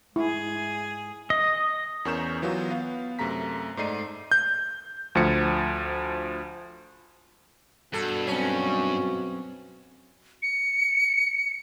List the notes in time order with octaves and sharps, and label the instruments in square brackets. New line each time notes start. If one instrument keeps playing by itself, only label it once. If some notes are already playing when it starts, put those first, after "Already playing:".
[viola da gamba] G#2 G#4 [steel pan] E4
[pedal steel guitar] D#5
[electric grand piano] E2 C#4 A#4 C#6 G6 E7
E3 F#3 B3 F4 F#4
B3 F5
F#2 C3 A3 A#5 B6
G#2 A3 D#4 D5 C7 D#7
G6
D2 F3 C#7
[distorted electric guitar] G2 [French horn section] B2 F#4 [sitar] A4
[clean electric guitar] F#2 C4 [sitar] C#4
[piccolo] C#7